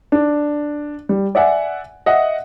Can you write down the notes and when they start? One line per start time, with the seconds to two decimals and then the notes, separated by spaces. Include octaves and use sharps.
0.12 D4
1.09 G3
1.35 D5 E5 F#5 G#5
2.06 D#5 E5 F#5